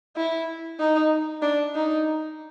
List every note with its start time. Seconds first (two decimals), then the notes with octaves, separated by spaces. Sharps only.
0.17 E4
0.79 D#4
1.42 D4
1.75 D#4